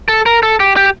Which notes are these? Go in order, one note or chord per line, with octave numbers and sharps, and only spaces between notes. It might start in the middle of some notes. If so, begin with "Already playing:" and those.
A4
A#4
A4
G4
G4